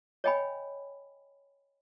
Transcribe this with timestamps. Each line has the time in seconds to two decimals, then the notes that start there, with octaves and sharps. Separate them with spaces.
0.24 C#5 D#5 G5 G#5 B5